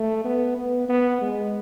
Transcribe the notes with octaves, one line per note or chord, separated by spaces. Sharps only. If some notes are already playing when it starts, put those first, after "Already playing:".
Already playing: A3
B3
B3
B3
G#3